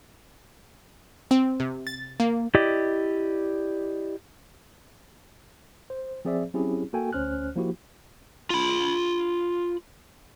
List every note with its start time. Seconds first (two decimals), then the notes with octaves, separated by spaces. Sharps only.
1.31 C4
1.60 C3
1.87 A6
2.20 A#3
2.55 E4 G4 D5 D#5
5.90 C5
6.25 F3 C4 G#4 C5 D5 E5
6.54 F#3 C4 C#4 E4 G4 G#4
6.93 A#3 F#4 A4 G5 G#5
7.13 D2 C#4 C5 F6 F#6
7.56 F3 A#3 E4 F#4 G4
8.50 F4 B5